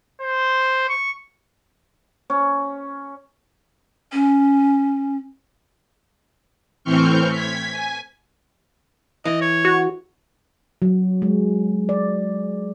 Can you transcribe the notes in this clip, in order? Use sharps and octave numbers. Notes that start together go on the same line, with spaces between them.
C5
C#6
C#4
C#4
A2 E3 C4 C#6 F6 G6
G#6 B6
G#5
E3 D#5
C#5
F#4
F#3
G#3
D5